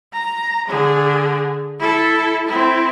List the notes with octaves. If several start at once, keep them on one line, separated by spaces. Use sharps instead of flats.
A#5
D3 G#4
E4 A4
C4 E4